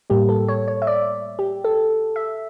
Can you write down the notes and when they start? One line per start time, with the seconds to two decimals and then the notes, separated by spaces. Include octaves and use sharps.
0.10 A2 G3 A#3 G4
0.29 A4
0.48 C#5
0.68 C#5
0.82 E5
0.87 D5
1.39 G4
1.64 A4
2.16 E5